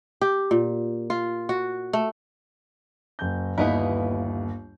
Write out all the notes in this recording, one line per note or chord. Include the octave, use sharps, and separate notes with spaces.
G4
A#2
F4
F#4
A3
F#1 G6
G1 D#2 B3 D#4 E4